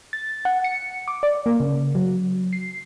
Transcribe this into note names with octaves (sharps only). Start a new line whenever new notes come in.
A6
F#5
C#7
D6
D5
A#3
C#3
F#3
C7